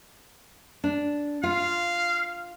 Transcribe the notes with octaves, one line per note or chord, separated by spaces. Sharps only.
D4
F4 F5